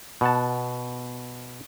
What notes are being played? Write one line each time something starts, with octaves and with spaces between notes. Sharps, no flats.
B2 F#5 A5